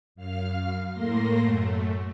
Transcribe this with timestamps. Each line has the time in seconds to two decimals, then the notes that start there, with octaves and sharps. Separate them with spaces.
0.15 F#2 F5 F6
0.93 A2 A3 A#3 C6 A#6
1.41 F#2 A3